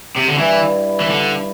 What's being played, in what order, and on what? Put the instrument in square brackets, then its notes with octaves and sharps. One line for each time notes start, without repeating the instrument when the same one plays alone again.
[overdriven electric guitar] C3
D3
[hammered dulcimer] G2 G3 E4 [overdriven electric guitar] E3
[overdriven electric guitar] E3
D3